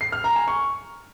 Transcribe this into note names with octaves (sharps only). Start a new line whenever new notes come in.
C7
F6
A#5
G#5
C#6